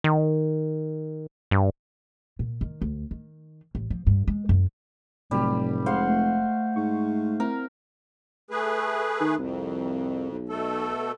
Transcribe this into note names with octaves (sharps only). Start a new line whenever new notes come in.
D#3
G2
A#2
D#3
D2
D#3
A1
F3
G2
G#3
F#2
F1 A2 C3 F#3 G3
G#3 C5 F5 F#5
A3
G#2 C#6
C4 E4 A#4
A3 G#4 B4
D#3
C2 F2
B1
B2 A3 A4